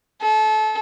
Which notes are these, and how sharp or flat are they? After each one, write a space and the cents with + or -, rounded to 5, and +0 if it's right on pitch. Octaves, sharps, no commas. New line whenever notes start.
A4 -30